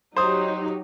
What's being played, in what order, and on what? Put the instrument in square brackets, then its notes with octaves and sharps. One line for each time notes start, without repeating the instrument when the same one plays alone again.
[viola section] F#3 D#4 G4 [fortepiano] C5 D#6